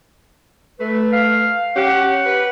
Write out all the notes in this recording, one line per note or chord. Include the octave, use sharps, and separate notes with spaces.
A3 B4
F5
C#4 G4 F#5
B4